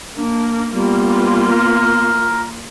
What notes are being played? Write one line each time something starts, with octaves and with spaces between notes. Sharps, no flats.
A#3 D4
G3 A#3 B3 F4
A#4